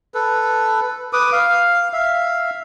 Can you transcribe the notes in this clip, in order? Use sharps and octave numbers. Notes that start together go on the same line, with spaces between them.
A4 B4
B4 D6 D#6
F5
E5 F5